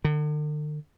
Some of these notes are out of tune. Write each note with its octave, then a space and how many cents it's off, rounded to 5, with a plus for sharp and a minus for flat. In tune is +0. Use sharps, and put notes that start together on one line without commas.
D3 +45